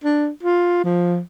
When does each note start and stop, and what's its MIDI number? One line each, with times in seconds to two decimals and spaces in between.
0.04 0.29 62
0.43 0.81 65
0.84 1.20 53